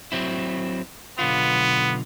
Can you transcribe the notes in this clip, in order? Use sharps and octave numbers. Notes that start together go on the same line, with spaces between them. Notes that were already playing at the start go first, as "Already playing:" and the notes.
F#3 C4 E4
B1 D3 B3 F4